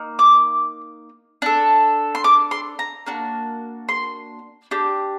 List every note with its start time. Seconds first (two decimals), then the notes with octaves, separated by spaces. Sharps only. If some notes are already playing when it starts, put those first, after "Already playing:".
Already playing: A#3 D#4
0.19 D6
1.42 D4 A4
2.15 C6
2.24 D6
2.51 C6
2.79 A#5
3.06 A#3 D4 F#4
3.89 C6
4.71 D4 G4